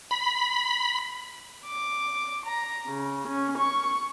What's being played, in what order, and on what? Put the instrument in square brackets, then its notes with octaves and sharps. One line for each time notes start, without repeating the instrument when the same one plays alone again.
[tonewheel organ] B5
[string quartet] D6
A#5
C#3
C#4
C#6